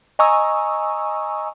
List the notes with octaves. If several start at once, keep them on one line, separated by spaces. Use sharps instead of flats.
D#5 G#5 A#5 C#6 D#6 E6